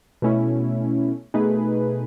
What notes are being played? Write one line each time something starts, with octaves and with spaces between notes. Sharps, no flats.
B2 A3 C#4 E4
B2 A3 D#4 G#4 B4